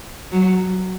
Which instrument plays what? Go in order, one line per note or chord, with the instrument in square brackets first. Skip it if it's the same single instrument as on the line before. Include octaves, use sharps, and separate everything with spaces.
[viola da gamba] F#3